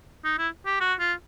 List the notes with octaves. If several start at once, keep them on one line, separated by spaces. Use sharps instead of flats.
D#4
E4
G4
F#4
F4